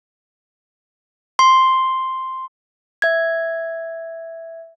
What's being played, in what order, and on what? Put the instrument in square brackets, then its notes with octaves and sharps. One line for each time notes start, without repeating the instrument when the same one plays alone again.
[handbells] C6
[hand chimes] E5 G#6